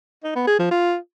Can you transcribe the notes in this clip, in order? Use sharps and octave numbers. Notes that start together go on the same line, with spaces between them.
D#4
B3
G#4
F3
F4